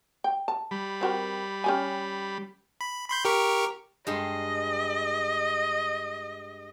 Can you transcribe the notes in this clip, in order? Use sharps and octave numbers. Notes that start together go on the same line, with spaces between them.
G5
A5
G3 B5
C4 F#4 A#4
C#4 G4 G#5
B5
B5 C6 G6
G4 A#4 C#6
G2 G#3 D#5 C6